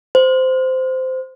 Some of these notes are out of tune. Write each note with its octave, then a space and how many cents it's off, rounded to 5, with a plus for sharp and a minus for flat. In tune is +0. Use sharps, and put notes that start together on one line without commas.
C5 -15